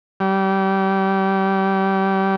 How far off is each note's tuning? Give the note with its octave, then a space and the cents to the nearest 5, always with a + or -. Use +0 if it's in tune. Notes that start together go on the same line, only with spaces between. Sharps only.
G3 -25